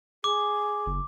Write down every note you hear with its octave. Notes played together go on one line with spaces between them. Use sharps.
G#4 D6
F#1